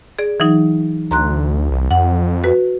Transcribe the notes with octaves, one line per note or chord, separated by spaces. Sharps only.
G#4 D5
E3 F#3 D#4
D2 A#5 C6 F#6
C2
F2 F#5
F#4 B4